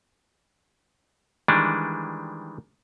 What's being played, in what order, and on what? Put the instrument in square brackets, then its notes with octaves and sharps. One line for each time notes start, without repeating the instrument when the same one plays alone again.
[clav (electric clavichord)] D#3 E3 G3 G#3 D4